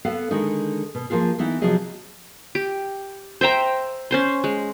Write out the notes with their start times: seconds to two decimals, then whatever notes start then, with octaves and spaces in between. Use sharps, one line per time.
0.05 B3 A4 F5 F#5
0.31 D3 D#3 G#3 D#4
0.95 B2
1.10 F3 F#3 A#3 F4 G#4
1.39 E3 B3 D#4 E4
1.61 C3 F3 F#3 C4 G#4 D#5
2.55 G4
3.41 C5 E5 G5 A#5
4.11 C#4 C5 C6
4.44 G#3